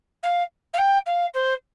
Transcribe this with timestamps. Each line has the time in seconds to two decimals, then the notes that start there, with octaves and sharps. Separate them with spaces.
0.23 F5
0.73 F5
0.78 G5
1.06 F5
1.34 C5